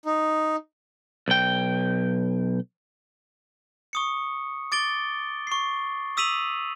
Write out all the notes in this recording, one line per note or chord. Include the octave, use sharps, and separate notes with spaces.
D#4
B1 G5
C#6 D#6 C#7
D6 A6 D7 G7
C#6 C7
D#6 E6 B6 D#7 F7 F#7